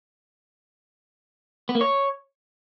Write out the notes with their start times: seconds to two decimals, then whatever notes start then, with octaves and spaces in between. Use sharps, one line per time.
1.69 B3
1.75 A#3
1.81 C#5